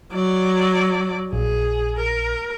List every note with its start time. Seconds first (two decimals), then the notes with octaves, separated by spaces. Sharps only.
0.13 F#3 D5
1.33 A#1 G#4
1.97 A#4